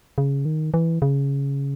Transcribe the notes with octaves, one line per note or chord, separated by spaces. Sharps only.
C#3
D#3
E3
C#3